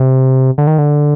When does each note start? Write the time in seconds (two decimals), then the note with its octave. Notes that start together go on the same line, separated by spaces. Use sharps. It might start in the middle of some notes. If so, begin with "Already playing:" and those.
Already playing: C3
0.58 D3
0.67 D#3
0.78 D3